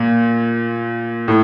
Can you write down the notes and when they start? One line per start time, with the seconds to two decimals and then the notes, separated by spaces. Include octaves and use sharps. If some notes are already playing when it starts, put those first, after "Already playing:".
Already playing: A#2
1.28 A2